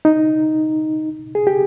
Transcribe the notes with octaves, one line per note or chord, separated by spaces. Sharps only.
D#4
G#4
G4